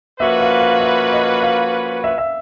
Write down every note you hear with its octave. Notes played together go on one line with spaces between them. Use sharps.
F3 A#3 C#4 F#4 B4 E5
F5
F5
E5
D#5
F5
E5
E5